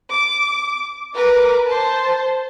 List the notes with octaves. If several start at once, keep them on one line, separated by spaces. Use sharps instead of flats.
D6
A#4 B4 D6
C5 A5